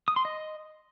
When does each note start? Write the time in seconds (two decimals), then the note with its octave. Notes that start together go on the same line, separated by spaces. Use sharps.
0.08 D#6
0.16 C6
0.25 D#5